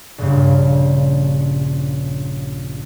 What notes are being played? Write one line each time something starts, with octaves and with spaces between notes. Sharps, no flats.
A#1 G2 C#3